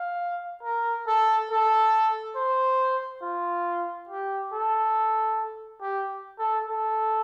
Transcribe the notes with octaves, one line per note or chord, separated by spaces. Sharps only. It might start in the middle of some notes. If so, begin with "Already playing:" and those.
Already playing: F5
A#4
A4
A4
C5
F4
G4
A4
G4
A4
A4